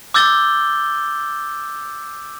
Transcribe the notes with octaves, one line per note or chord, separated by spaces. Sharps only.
D6 E6 G6 A6 G7